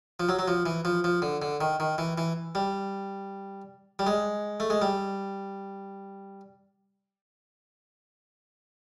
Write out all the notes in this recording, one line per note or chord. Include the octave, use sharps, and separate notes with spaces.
F3
F#3
F#3
F3
E3
F3
F3
D3
D3
D#3
D#3
E3
E3
G3
G3
G#3
A3
G#3
G3